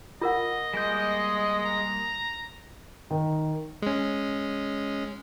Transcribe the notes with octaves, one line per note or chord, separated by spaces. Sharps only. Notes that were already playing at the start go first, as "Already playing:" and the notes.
F4 A#4 D#5 F#5
G3 G#3 A#3 G6
A#5
D#3
G#3 C#4